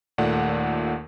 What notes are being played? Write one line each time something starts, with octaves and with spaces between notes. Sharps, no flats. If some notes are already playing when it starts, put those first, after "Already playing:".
D#2 A#2 A3 D5 F#5